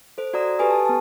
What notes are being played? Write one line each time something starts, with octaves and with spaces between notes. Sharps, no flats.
A4 C5
F#4 D5 A#5 D#6
G4 A4 B4 G#5 D#6
A5
B3 A5